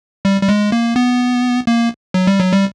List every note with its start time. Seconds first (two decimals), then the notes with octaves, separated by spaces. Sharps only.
0.25 G3
0.42 G3
0.49 G#3
0.72 A#3
0.96 B3
1.67 A#3
2.14 F#3
2.27 G3
2.40 F#3
2.53 G3